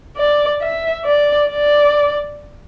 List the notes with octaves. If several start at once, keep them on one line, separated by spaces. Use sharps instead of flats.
D5
E5
D5
D5